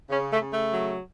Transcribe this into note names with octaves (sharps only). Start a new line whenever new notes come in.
C#3 C#4
A3
C#3
A3
F#3